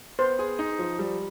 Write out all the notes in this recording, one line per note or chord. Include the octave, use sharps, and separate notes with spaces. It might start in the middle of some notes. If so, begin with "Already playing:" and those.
B3 C5
G#4
D#4
F3
G3